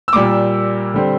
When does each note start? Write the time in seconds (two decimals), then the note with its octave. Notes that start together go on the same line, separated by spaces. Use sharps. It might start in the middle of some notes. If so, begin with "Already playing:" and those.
0.08 E6
0.13 A#2 G3 A#3 D6
0.94 D3 G3 C4